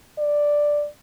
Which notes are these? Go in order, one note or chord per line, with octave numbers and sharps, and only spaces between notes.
D5